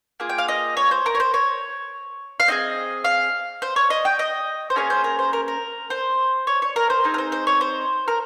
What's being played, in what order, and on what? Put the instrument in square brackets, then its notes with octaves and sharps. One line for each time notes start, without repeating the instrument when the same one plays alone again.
[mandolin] A#3 F4 G#4
G5
F5
D#5
C#5
C5
A#4
C#5
C5
C#5
F5
C4 F4 G#4 D#5
F5
C5
C#5
D#5
G5
D#5
C5
A#3 C#4 G#4 C#5
C5
A#4
C5
A#4
A#4
C5
C#5
C#5
A#4
C5
C4 D#4 G#4
A#4
C5
C5
C#5
C5
A#4